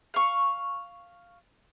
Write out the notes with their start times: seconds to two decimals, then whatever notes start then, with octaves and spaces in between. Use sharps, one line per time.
0.14 F5 C#6